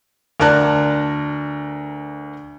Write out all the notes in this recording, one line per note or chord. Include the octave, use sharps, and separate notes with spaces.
D2 A#4 D5 A5 F#6